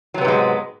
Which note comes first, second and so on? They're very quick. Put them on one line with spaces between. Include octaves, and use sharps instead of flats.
F#3 C3 B3 G#2 G#3